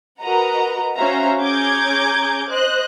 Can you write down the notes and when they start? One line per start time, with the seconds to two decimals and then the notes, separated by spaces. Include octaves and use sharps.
0.22 F#4 A#4 B4 D#5 F#5 A#5
0.96 C#4 F#4 C5 E5 F5 A#5
1.40 C#4 G#4 A#5 D6 G6 G#6
2.49 C5 D#5 F#6